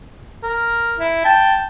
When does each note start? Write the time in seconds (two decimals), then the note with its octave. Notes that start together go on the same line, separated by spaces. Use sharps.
0.43 A#4
0.98 E4
1.25 G5 A5